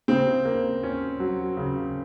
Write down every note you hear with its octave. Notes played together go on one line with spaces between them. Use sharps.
C#3 C4
A#3
C#4
F#3
C#3